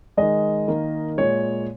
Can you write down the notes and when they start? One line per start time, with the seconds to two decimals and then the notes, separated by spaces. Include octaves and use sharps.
0.17 D#3 G#3 D#5
0.68 D#3 A#3
1.18 A#2 G#3 C#5